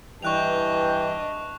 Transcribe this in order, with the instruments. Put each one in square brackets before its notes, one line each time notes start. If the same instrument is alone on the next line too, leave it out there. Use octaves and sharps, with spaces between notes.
[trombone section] G2 E3 [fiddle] D4 D#5 [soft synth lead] G5 [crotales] C#6 F#6 F7